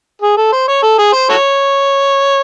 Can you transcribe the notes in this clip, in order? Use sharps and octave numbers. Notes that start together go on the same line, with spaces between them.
G#4
A4
C5
C#5
A4
G#4
C5
F#4 A4 C#5